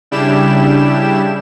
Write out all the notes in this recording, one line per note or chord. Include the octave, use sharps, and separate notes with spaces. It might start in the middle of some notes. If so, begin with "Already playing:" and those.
C#3 G3 D4 E4 G4 E7